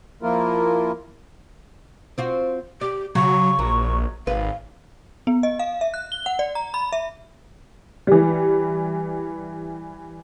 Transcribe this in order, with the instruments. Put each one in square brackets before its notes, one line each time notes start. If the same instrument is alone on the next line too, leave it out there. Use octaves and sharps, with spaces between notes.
[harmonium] F3 A#3 E4 F4 A#4
[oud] C4 F4 F#4
[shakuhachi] G4 [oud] D5
[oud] C#3 [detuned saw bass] F#3 [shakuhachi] C#6
[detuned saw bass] A#1 [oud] F#3
[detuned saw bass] G#1 [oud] B4 [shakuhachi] F5
[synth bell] B3
D#5
F5
E5
F#6
G7
F#5
D5
A#5
B5
E5
[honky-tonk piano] E3 G3